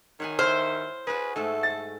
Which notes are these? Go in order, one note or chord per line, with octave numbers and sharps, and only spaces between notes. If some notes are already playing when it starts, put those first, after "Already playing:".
D#3 C#5 F#5 G#5
E4 C5 F6
F#4 G#4 B4
G#2 A3 A4
A6